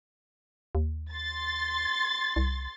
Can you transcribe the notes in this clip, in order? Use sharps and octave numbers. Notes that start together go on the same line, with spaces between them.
D#2
C6 A6
C2